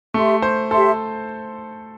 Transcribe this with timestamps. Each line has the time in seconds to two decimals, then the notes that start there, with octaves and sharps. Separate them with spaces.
0.14 A3 G4 E5 C6
0.42 C5
0.71 G4 A4 E5 C6